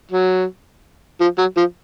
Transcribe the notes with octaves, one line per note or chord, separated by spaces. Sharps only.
F#3
F3
F#3
F3